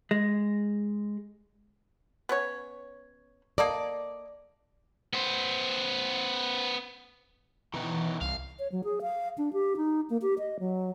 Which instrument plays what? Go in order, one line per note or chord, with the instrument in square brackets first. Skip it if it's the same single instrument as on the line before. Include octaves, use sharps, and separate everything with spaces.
[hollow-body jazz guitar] G#3
[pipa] B3 C#4 C#5
[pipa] A#3 A4 D#5 [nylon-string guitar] D5
[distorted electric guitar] B3 C5
[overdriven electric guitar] B2 D#3 [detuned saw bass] E3
[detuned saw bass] C2 [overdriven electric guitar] F5
[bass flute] C#5
F#3
G#4
F5
D4
G4
D#4
A#3
G4
D#5
F#3